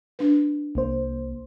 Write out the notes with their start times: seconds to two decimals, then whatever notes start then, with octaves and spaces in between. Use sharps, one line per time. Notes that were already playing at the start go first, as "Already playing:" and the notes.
0.19 D4 B4
0.75 C2 A#3 C5